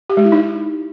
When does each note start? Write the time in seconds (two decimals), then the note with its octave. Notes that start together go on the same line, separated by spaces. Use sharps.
0.10 G4
0.17 G#3
0.25 E4
0.32 D#4